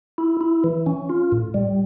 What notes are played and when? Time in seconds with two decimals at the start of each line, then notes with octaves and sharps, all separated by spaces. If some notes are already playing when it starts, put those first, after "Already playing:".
0.18 E4
0.41 E4
0.64 E3
0.86 C#4
1.10 F4
1.32 A2
1.54 G3